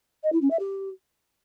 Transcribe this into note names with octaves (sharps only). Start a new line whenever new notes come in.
D#5
E4
C#4
E5
G4